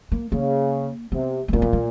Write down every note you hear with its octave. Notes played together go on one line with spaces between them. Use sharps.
A#3
C#3 A#3
C3 B3
A3
A#2 A#3
B3
A#3